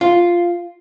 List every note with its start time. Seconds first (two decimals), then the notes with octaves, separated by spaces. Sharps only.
0.01 F4